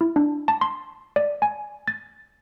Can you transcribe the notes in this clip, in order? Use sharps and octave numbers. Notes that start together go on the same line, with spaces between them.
E4
D4
A5
C6
D5
G#5
A6